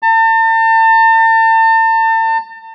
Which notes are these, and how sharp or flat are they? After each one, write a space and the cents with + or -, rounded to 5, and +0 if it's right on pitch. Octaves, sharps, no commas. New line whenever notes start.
A5 +40